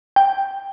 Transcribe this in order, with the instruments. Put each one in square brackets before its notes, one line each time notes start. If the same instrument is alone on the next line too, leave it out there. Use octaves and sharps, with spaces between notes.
[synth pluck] G5